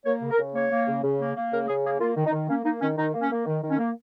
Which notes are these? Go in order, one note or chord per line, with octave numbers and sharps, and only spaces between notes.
A#3 C#5
C#3
A#4
C#3
A#3 C#5
A#3
C#3
C#3
A#3
A#3
C#3 A#4
C#3 G#4
A#3 G#4
A#3 F4
D#3
D#4
D#3
A#3 C#4
A#3 D#4
D#3 C#4
D#3 D#4
A#3
C#4
A#3
D#3
D#3
C#4
A#3